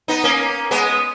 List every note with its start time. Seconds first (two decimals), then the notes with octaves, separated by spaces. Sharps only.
0.08 B3 D#4
0.24 A#3 C#4
0.71 G#3 B3